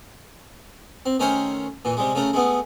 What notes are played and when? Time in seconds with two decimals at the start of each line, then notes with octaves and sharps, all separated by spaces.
1.06 C4
1.20 D#3 A3 C#4 A#4 C5 C#5
1.85 A#2 E3
1.97 C3 G3 G#3
2.15 C#3 A3 A#4
2.33 G#3 A3 B3